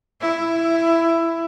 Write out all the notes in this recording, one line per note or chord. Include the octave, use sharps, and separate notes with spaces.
E4